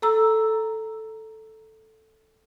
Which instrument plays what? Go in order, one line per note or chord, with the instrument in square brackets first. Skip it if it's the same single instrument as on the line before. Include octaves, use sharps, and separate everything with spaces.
[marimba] A4 A#5 E6